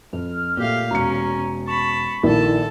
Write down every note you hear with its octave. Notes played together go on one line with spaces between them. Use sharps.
F2 F6
A#2 A3 G4 F5
E1 C#4 A#5 C#7
A5 B5 C#6
A#1 D#3 A#3 E4 A4 A5